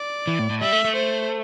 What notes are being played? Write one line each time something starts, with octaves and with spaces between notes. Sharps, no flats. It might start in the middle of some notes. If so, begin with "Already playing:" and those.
Already playing: D5
E3
A2
A2
G3 E5
A3
A3
C5